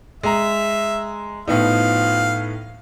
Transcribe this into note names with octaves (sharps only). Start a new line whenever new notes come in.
G#3 E5 A#5
A2 F3 B3 D#4 F5